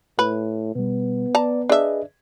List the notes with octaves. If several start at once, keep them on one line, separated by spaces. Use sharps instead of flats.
A2 B4
B2 G3 B3
D5 A5 A#5
D4 G#4 B4 D#5 E5